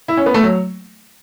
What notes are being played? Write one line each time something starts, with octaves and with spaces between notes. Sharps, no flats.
E4
C#4
B3
A3
F#3